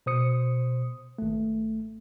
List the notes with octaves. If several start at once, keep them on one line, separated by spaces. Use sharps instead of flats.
B2 C5 D#6 C#7
G#1 A3